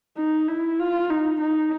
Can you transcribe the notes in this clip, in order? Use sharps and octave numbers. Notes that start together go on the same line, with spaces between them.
D#4
E4
F4
D#4
D#4